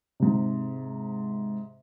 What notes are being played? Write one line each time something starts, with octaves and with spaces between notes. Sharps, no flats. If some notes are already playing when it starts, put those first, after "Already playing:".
G#2 C3